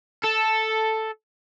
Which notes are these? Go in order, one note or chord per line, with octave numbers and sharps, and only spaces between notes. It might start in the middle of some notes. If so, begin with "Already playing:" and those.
A4